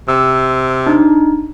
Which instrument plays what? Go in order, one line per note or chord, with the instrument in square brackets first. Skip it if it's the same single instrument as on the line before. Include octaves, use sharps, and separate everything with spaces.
[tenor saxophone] C3 [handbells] E6
[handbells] D4 D#4